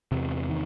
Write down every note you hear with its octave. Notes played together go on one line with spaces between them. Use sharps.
E2 C3
D#3